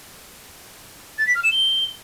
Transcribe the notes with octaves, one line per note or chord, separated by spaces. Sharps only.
A6
B6
F6
E7
G7